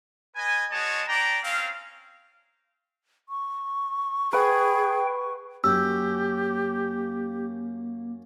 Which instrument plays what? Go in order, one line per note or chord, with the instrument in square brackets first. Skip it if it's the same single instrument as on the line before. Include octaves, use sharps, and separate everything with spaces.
[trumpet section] B4 D#5 G#5
G#3 F#4 C#5 D#5 A5
D4 D5 G5 A#5
C4 C#4 F5
[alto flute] C#6
[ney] G#4 [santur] B4 F#5 [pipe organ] G5
[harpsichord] F#2 C#4 [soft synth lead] A#3 [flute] G4 [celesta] E6